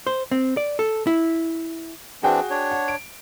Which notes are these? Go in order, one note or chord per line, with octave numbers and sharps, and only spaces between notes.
C5
C4
D5
A4
E4
E3 C4 D4 F#4 G#4 G5
D4 C#5
F#5
D7